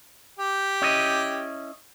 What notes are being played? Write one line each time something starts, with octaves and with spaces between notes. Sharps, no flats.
G4
C#4 E4 D#5